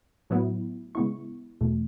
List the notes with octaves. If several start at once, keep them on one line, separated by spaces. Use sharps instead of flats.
A2 F#3 B3 E4
C#3 G#3 B3 E4 C#6
E2 B2 A3